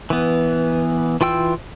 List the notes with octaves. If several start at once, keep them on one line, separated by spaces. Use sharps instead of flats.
E3 B3
E3 F4 G5 E6